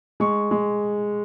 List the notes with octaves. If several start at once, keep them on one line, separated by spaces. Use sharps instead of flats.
G#3 C#6
G#3